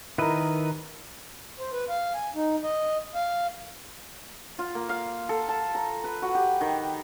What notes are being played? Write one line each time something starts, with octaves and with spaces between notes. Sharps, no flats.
D#3 E4 A#4 B4 D#5
C5
B4
F5
G#5
D#4
D#5
F5
F4
A#3
F5
A4
A5
A#5
B4
F#4
G4
D#3